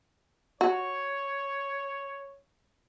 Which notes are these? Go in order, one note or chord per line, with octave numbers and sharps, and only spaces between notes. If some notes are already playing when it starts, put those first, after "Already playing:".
F#4 C#5